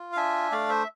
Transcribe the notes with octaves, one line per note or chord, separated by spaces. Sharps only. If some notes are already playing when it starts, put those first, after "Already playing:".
Already playing: F4
F5
D4 E5 G#5
A3 D5 F5
C5 E5